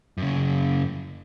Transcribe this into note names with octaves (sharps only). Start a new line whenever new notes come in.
F#2 C#3